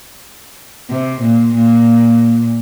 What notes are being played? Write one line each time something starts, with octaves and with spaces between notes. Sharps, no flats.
C3
A#2
A#2